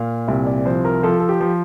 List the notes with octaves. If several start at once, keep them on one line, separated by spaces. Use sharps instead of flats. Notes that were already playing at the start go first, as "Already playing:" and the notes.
Already playing: A#2 F5
C2 E5
D5
F3 C5
A#4
F3 A4
A4
G4
F3